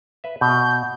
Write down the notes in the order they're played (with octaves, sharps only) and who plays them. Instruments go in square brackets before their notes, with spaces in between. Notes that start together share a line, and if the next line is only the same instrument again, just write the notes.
[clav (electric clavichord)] B4 E5
[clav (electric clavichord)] B2 [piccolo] G6